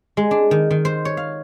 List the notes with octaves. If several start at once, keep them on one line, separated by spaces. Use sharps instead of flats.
G#3
D4
D#3
D#3
C5
C#5
F5